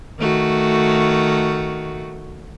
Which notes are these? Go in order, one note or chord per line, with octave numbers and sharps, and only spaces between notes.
D#3 A3 F#4